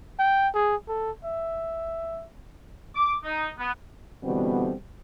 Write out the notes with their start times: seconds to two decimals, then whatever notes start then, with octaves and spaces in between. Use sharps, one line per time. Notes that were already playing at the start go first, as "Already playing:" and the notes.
0.19 G5
0.54 G#4
0.88 A4
1.25 E5
2.94 D6
3.24 D#4
3.58 B3
4.23 B2 D3 E3 G3 B3 C4